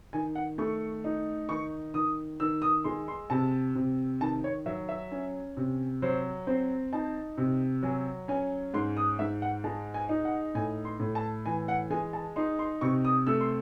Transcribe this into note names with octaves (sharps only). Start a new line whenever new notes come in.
D#3 G#5
F#5
A3 C#6
D#4
D#3 C#6
D#3 D#6
D#3 E6
D#6
G#3 C6
C6
C3 A5
C3
D#3 A5
C#5
F#3 E5
E5
C#4
C3
F#3 C5
C4 C5
D#4 A5
C3
F#3 G#5
C#4 G#5
G#2 C6
D#6
G#2 E5
F#5
G#3 A5
G#5
D#4
F#5
A2 G#5
C6
A2
A5
E3 G#5
F#5
G#3 G#5
A5
D#4 C6
C6
C3 C#6
D#6
A3 E6
C6